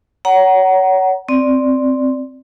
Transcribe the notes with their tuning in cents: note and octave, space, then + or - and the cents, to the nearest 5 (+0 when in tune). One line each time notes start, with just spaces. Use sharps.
C#5 +25 F#5 +25 A#5 +15
C4 +0 D5 +0